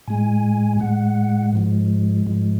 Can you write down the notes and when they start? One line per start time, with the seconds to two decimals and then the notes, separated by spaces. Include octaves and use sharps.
0.08 A2 G#3 G#5
0.80 A2 G#3 F#5
1.54 G#2 F3 G#3
2.27 G#2 F3 G#3